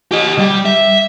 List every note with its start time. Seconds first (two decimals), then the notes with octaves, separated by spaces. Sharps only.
0.12 G4 D#5
0.38 G3
0.66 E5